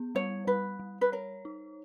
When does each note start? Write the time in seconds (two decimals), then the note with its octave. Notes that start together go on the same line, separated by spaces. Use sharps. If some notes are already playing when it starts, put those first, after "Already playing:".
Already playing: B3
0.15 G3 C#5
0.47 G3 B4
0.79 G3
1.01 B4
1.12 A#4 C#5
1.45 D#4